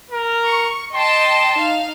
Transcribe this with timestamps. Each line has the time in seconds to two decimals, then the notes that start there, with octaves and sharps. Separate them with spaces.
0.10 A#4
0.45 C#6
0.93 D#5 G5 A5 C6
1.57 D#4 F5